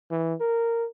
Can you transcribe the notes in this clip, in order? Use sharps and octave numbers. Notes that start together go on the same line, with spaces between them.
E3
A#4